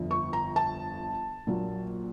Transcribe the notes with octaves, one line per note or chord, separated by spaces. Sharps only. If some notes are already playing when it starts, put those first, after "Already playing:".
Already playing: G1 F2 D3 F3
C#6
A#5
A5
A#1 A#2 F#3